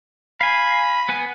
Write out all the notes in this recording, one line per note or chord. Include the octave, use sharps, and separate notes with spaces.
F5 G#5 B5
B3 B4 G#5